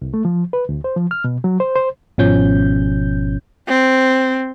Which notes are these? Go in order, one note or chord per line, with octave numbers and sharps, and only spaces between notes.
C2
A3
F3
B4
D2
C5
F3
F6
B2
F#3
C5
C5
G#1 B2 F3 C#4 G6
C4